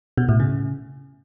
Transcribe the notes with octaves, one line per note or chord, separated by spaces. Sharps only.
B2
A2
C#3